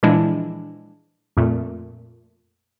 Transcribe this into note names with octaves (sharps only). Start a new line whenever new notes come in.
A#2 E3 F3 G#3 D4 E4
F2 A#2 A3